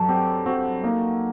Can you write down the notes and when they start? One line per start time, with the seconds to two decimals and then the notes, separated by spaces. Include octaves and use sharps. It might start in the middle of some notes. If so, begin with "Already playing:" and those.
Already playing: G2 F#3 A4
0.08 C4 G4
0.46 C4 F#4
0.83 A#3 D#4